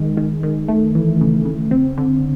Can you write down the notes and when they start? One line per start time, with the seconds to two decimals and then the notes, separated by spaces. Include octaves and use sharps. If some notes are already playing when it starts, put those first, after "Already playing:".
Already playing: D#3 G#3
0.17 D#3
0.43 D#3
0.68 A3
0.95 E3
1.21 C#3
1.45 C#3
1.71 C4
1.98 D3